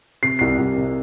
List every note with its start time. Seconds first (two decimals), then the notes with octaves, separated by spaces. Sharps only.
0.22 C3 C7
0.39 C2 C7
0.58 C2
0.77 C3